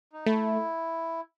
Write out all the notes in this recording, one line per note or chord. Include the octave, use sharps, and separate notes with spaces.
D#4
A3 E4